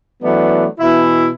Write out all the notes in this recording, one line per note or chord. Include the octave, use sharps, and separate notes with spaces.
E3 F#3 A3 B3 D4
B2 E3 E4